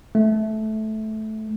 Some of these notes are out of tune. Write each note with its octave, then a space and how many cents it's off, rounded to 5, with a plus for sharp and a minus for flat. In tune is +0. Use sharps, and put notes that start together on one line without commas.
A3 -15